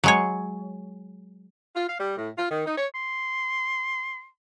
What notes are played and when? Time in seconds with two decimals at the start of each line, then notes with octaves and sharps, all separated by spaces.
0.04 F#3 G#3 C#5
1.75 F4
1.88 F5
2.00 G3
2.16 A2
2.37 F4
2.50 D#3
2.65 D#4
2.77 C#5
2.95 C6